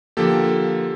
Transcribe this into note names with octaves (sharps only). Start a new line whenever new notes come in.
D3 F3 A#3 G4 A4